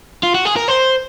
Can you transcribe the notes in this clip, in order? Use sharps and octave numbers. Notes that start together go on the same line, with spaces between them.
F4
F#4
G#4
A#4
C5